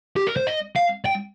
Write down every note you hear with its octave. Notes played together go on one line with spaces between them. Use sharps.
G4
A#4
C5
D#5
F5
G5